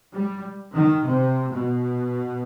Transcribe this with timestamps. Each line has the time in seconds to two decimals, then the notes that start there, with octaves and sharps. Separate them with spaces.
0.13 G3
0.75 D#3
1.06 C3
1.53 B2